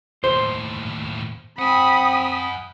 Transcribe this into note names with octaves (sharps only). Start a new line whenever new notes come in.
D#2 A2 C5
C4 F#5 G#5 B5 D#6